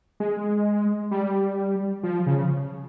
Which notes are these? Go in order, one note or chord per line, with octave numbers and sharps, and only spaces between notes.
G#3
G3
F3
C#3